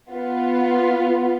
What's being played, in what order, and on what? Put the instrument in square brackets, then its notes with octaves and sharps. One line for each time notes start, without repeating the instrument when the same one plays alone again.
[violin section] B3 F4 B4